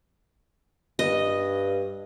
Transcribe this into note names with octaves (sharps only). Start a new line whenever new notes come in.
G2 D#5